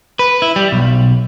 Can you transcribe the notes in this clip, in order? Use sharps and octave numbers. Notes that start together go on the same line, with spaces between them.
B4
E4
G3
B1